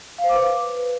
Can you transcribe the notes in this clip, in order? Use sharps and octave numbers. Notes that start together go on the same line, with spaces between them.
F5
C5
D6
B4